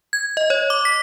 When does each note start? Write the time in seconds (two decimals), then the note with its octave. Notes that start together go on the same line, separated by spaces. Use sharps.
0.13 G#6
0.37 D#5
0.50 C#5
0.70 D6
0.85 B6